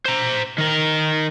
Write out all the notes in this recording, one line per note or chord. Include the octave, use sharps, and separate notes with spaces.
C5 A#5
D#3 A#4